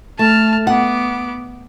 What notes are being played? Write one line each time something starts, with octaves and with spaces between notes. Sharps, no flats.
A3 A5 F6
B3 F#5 D6